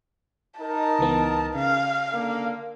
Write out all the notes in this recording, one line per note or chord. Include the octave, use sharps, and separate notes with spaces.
D#4 A#4 A5
C#2 E3 B3
C#3 F5
D3 A#3